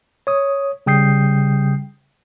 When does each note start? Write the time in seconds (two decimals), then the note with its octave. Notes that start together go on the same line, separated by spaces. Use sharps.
0.27 C#5 D#6
0.86 C#3 G3 G5 D#6 G6 C7